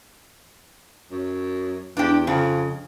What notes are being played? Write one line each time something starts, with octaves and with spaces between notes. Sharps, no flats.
F#2
E2 D4 G4
F2 C#3